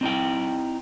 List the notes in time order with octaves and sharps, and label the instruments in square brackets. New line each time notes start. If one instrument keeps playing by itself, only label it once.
[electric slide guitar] C4 D#4 E4 G5